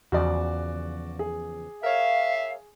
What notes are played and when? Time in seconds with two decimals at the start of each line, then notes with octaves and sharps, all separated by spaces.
0.12 E2 C#3 F3 F#4 D5
1.19 G#4
1.83 A#4 C#5 E5 F5